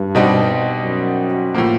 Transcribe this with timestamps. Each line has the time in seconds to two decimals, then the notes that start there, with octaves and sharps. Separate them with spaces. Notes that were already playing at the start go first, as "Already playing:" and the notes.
Already playing: G2
0.15 B2 G3 C4 D#4
0.84 F#2
1.54 A2 F3 A#3